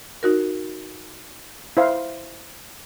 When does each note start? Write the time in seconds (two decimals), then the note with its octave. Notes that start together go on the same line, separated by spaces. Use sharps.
0.23 D#4 F#4 A#4
1.77 E4 C5 F5